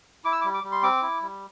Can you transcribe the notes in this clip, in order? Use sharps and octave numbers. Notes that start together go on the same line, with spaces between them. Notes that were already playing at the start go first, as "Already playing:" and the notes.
E4 D6
E6
D6
G3
D6
G3
C6
C4 D6
E4
G3